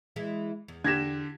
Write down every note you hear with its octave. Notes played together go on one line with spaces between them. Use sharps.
E3 G#3 E4
E2
D3 G4 G#6 A#6 E7